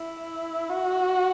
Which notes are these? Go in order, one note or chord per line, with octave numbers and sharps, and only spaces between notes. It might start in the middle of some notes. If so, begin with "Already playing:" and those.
Already playing: E4
F#4